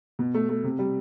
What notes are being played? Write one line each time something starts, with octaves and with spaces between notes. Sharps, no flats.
B2
A3
A3
C3
G3